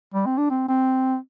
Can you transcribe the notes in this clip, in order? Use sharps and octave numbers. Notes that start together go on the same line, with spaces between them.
G3
C4
D4
C4
C4